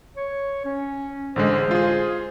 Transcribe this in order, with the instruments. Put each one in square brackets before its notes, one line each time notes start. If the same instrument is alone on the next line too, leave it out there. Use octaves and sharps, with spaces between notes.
[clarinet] C#5
C#4
[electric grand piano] A1 D3 G#3 [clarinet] C5
[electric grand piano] F4 G#4